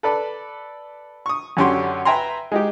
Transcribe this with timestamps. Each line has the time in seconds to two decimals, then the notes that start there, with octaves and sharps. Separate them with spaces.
0.03 A4 B4 D5 A5
1.26 C#6 D#6
1.57 F#2 D3 C#4 D4 G4 C6
2.05 B4 E5 G5 G#5 A#5 C6
2.52 G#3 D#4 G4